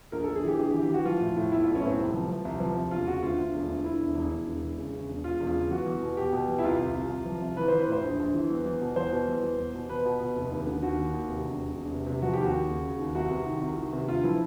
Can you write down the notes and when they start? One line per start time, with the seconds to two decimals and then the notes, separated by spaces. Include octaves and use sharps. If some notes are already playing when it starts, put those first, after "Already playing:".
0.12 A#1 A#4
0.24 A#1 A4
0.36 G#4
0.44 E3 G4
0.59 A#1 G#4
0.70 G4
0.74 E3
0.82 G4
0.90 E3 F#4
1.05 F3 F4
1.21 A2
1.36 A2
1.52 B1 E4
1.63 B1 F4
1.75 C#4
1.83 A2 C4
1.98 C2
2.14 F3
2.29 F3
2.45 C2
2.60 F3
2.76 C2
2.91 E1 F4
3.07 C#3 F#4
3.22 D2 F4
3.38 D2
3.53 E1
3.69 D2
3.84 D2 E4
4.00 E1
4.15 E1
4.31 E1
4.47 E1
4.62 E1
4.77 C#3
4.93 C#3
5.09 E1
5.24 E1 F4
5.40 E1
5.47 F4
5.55 C#3
5.71 E2 F#4
5.86 E2
6.02 B2
6.17 B2 G4
6.33 B2
6.48 E2
6.59 E4
6.64 C2 F4
6.79 C2
6.94 C2
7.10 C2
7.26 F3
7.42 C2
7.57 E3 B4
7.68 E3 C5
7.80 B4
7.88 A2 C5
8.03 A#1
8.19 A#1
8.34 E3
8.50 E2
8.65 E2
8.81 B2
8.96 E2 C5
9.12 B2
9.28 E2
9.43 E2
9.58 E2
9.74 B2
9.89 B2 B4
10.05 B2
10.20 B2
10.36 F1
10.52 D#2
10.67 D3
10.82 D#2 F#4
10.98 D#2
11.14 D#2
11.29 C3
11.45 E1
11.60 E1
11.76 E1
11.91 C3
12.07 C3
12.22 F3 F#4
12.33 D#2 G4
12.44 F#4
12.53 D#2
12.69 C#3
12.84 C#3
12.99 D#2
13.15 C2 F#4
13.31 C3
13.46 D#3
13.61 C2
13.77 D#3
13.93 C3
14.08 D2 F4
14.23 F3 E4